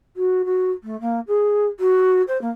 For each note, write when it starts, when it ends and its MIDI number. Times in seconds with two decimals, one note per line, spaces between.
0.17 0.42 66
0.45 0.71 66
0.84 0.99 57
1.01 1.20 58
1.28 1.66 68
1.80 2.22 66
2.28 2.40 72
2.41 2.49 58